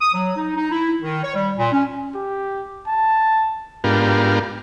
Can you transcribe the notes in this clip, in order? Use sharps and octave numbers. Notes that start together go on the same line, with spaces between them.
D#6
F#3
D#4
D#4
E4
D#3
C#5
G3
A#2
C#4
G4
A5
G#2 B3 D4 F4 G4 A#4